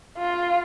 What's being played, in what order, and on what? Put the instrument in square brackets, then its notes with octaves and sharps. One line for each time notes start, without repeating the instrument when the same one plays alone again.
[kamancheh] F4